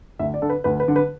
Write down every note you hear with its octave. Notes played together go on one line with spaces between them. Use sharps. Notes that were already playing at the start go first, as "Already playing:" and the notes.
D2 E5
D5
D3 A4
B4
D2 B4
B4
D3
B4